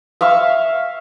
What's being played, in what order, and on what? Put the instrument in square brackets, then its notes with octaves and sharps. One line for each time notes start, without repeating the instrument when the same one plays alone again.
[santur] E5 F5 C#6